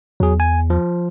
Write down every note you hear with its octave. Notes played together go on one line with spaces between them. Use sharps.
E2 F#3 G#4
G#5
F3